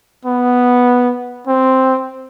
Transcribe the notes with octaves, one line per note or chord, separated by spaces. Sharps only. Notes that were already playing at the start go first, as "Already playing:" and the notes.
B3
C4